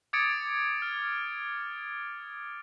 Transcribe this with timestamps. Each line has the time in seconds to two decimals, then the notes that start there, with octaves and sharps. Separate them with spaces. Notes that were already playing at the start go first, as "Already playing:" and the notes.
0.13 D6 D#6 G#6 A6 C#7 D7
0.82 F6